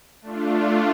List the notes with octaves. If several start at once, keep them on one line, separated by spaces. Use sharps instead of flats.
A3 D4 F4